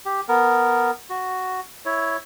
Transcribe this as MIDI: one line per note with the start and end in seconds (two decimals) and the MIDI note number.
0.05 0.21 67
0.29 0.91 59
0.29 0.91 70
1.10 1.60 66
1.85 2.17 64
1.85 2.17 73